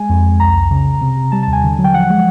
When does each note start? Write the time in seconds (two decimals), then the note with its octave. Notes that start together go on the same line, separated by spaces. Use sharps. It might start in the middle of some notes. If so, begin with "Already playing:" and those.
Already playing: G#3 G#5
0.09 F2
0.25 F2
0.40 C2 A#5
0.55 C2
0.71 C#3
0.86 C#3
1.01 C3
1.17 C3
1.32 G3 A5
1.43 D#2 A5
1.53 G#5
1.64 D3
1.78 F#3
1.84 G5
1.94 F3 F#5
2.10 G#3